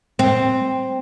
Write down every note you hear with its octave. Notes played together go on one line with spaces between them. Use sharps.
C4